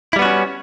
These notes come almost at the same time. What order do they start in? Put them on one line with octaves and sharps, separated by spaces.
E4 G3 B3 F#4 C#4